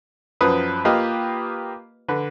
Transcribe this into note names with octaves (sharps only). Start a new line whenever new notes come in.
F#2 F3 B4 D#6
A#3 F4 G4 B4 D#5
D3 B4